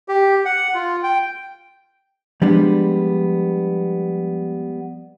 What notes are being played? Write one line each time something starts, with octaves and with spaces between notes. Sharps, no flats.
G4
F#5
F4
G5
F3 G3 G#3 B3 D4